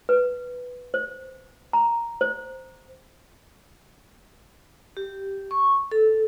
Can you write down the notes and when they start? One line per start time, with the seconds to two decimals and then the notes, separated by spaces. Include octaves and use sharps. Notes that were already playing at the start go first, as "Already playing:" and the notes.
0.09 B4
0.94 C5
1.73 A#5
2.21 C5
4.97 G4
5.51 C#6
5.92 A4